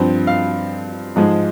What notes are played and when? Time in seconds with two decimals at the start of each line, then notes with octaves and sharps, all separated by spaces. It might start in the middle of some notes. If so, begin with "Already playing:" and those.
Already playing: G2 F3 C4
0.27 F5
1.16 G#2 F3 G#3